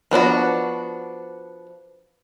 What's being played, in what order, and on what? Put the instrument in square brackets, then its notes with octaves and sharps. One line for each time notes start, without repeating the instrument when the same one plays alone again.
[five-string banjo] F3 B3 D4 F#4